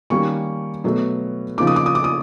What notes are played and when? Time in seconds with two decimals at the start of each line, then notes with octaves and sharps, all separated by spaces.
0.10 D#3 G3 A#3 C#4 C#6
0.84 B2 F#3 A3
1.58 C#3 F3 A#3 D#4 D6
1.67 D#6
1.76 D6
1.86 D#6
1.95 D6
2.04 D#6